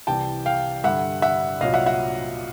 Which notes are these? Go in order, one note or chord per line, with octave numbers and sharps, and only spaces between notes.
C2 C3 E3 G3 G5 A5
F5 G5
G2 D3 G3 E5 F#5
E5 F#5
C2 A#2 F#3 D#5 F5
E5 F#5
E5 F#5